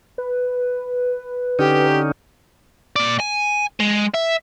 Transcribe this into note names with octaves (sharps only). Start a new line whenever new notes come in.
B4
D3 C#4 D#4 G4
A#2 D5
G#5
G#3
E5